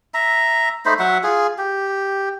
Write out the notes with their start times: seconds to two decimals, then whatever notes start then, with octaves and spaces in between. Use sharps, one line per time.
0.14 E5 A#5
0.86 A3 D#4 C5 B5
0.99 F#3 E5 F#5
1.24 F4 G#4
1.58 G4